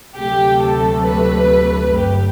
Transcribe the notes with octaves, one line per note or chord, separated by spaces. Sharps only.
D2 C3 F#3 A3 G4
A4
B4
G1 G2 F#3 A3 G4